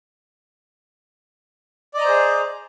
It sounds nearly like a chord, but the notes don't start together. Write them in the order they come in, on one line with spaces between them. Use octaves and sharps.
D5 D#5 A#5 C5 G#4